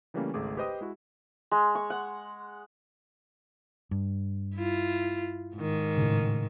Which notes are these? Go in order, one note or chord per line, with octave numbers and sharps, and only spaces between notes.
C#3 E3 G3 A3 A#3 C#4
G#1 C#2 A3 G#4 D6
G4 B4 C5 D#5 G5 D#6
G#3 E4 F#4
G#3
C#6
F#5
G2
E4 F4
G#2 D#3
A2 C#3